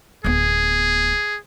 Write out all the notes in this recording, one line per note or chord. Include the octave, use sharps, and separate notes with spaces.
D1 B3 G#4